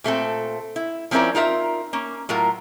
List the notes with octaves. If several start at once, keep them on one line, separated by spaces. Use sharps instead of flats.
A#2 A3 C4 A4
E4
F3 C4 C#4 E4 A#4 D5
D#4 F4 A#4 E5
A#3 C#4
A2 F#3 F4 A#4